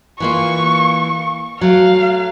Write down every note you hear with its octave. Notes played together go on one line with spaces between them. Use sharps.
E3 A#3 F4 C#6
F#3 A3 F5